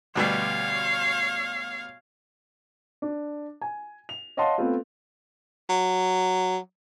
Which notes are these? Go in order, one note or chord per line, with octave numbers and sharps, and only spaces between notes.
D2 B2 G3 C#5 F5
D4
G#5
F7
C#5 D#5 F5 F#5 A5 C6
A3 B3 C4 F4
F#3